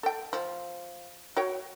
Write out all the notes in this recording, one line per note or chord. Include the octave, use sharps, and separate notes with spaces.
A4 G5
F3
F#4 C#5 G5